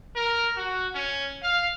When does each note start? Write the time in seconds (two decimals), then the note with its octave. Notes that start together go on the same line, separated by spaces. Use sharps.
0.15 A#4
0.56 F#4
0.94 C#4
1.42 F5